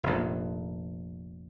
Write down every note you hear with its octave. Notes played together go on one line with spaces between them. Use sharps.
F1 A#1